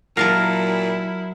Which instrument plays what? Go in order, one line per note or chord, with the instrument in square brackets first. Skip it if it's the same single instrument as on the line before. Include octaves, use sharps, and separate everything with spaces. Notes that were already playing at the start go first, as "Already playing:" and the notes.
[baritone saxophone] A#2 [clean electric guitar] F#3 F5 [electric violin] E4 [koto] A#4 A5 A#5